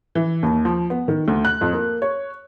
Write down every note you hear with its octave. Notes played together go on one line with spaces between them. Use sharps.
E3
D#2
F3
B3
D#3
D2
F#6
F2
A#3
C#5